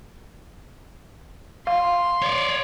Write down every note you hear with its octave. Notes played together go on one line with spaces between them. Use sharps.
F5 C6
C#5 D5